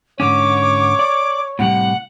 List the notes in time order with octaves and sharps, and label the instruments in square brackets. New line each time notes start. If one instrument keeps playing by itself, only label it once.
[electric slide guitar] G#2 D3 C#4 [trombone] C#5 [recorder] D6
[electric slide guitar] D5
[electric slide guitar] A2 C3 G3 [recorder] F#5